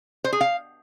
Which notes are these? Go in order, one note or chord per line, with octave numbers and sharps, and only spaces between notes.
C5
G#4
F5